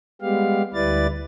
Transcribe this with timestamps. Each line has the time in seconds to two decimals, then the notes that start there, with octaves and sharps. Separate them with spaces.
0.21 G3 G#3 B3 G4 F5
0.74 D2 G3 E4 B4 D5 A6